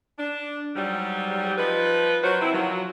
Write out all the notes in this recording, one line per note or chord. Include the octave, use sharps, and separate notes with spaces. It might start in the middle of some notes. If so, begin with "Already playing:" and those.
D4
G#2 F#3 G3
F3 D#4 B4
F#3 F#4 A#4 C5 C#5
C3 C4 C#4 E4
D#3 F3 F#3